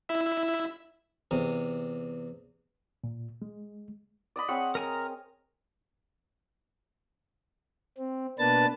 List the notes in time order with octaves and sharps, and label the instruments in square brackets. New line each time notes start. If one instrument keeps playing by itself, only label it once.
[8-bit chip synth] E4 E5
[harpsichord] E2 C3
[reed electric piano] A#2
G#3
[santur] D5 D#5 B5
[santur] C4 G#4 C#5 [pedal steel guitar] F#5
[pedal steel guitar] A#4 G#5 A#5
[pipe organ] C4
B2 A#3 D4 B4 A5 A6